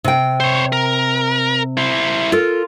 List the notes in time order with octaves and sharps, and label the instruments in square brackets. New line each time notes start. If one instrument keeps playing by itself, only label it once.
[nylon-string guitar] C3 G5
[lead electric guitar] C5 C#5
A#4
E4 C5
[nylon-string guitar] F4 A4 A#4